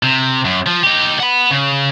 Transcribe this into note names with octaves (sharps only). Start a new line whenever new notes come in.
C3
F#2
F3
D#4 G4
F#5 B5
C#3